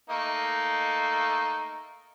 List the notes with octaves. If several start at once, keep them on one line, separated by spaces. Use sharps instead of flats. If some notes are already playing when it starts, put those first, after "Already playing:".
A3 A#3 D#4